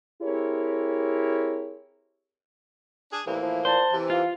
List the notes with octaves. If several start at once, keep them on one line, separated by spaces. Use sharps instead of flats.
C4 E4 G4 G#4 A#4 C#5
D4 G#4
C2 A2 E3 A#3 E4
F3 E4
A#2 C5 A5
C3 E3
F4 F5